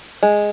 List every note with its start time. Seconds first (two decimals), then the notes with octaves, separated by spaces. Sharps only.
0.23 G#3